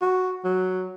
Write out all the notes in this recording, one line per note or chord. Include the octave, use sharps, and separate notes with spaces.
F#4
F#3